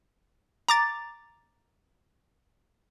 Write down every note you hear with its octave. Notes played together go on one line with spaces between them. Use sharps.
A#5 D6 A6